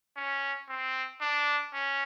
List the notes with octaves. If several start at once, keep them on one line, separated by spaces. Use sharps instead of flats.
C#4
C4
D4
C#4